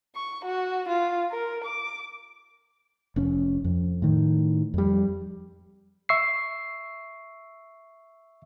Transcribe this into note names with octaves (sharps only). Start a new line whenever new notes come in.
C#6
F#4
F4
A#4
D6
F1 C#4
F2
A2 D#3
F2 G3
E5 C#6 E6 C7